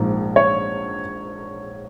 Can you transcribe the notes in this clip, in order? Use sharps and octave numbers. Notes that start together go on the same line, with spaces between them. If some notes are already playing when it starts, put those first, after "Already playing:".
Already playing: A#1 G#2 F3 A#3
C#5